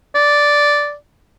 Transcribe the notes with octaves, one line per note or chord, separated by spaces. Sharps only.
D5